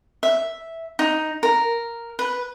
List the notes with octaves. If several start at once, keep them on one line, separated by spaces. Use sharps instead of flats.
E5
D#4
A#4
B4